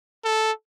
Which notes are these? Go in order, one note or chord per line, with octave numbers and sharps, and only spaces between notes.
A4